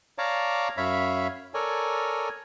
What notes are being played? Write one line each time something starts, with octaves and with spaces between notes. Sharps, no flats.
C#5 D5 F5 A5 A#5 D6
F#2 C#5 E5 F5 B5
A4 A#4 C#5 D5 G#5